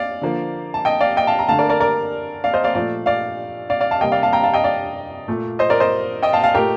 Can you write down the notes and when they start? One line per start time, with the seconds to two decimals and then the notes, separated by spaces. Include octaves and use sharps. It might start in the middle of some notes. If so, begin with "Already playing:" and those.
Already playing: D5 F5
0.21 D3 F3 A#3
0.74 A5
0.85 D#5 G5
1.01 D5 F5
1.17 D#5 G5
1.27 F5 A5
1.39 A#5
1.49 D3 A3 F5 A5
1.59 A#4 D5
1.69 A#4 D5
1.80 A#4 D5
2.44 D5 F5
2.54 C5 D#5
2.64 D5 F5
2.74 A#2 F3 A3 D5 F5
3.06 D5 F5
3.70 D5 F5
3.80 D5 F5
3.91 F5 A5
4.01 C3 G3 A#3 D#5 G5
4.12 D5 F5
4.23 F5 A5
4.33 G5 A#5
4.43 F5 A5
4.54 D#5 G5
4.64 D5 F5
5.28 A#2 A3
5.59 C5 D#5
5.70 A#4 D5
5.80 C5 D#5
6.23 D#5 G5
6.33 F5 A5
6.43 F5 A5
6.54 A#2 A3 G4 A#4